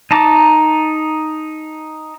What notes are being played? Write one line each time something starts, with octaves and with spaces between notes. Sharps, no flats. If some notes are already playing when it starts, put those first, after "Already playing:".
D#4 A5 A#5 D6